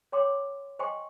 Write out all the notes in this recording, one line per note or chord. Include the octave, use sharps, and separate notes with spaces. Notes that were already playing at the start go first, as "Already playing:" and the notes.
C#5 G5 C6 D6
C5 D#5 G5 G#5 C6 C#6